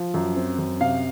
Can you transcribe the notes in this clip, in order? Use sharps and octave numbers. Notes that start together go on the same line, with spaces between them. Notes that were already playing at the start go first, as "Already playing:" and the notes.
Already playing: F3
F#2
C4
F#2
C3 F5